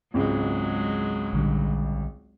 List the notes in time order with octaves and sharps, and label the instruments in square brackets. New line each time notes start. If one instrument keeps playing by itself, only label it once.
[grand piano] G#1 C#2 [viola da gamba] F#3 G#3
[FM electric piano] A#1 D3 G3